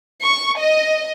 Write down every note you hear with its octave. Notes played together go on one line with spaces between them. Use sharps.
C#6
D#5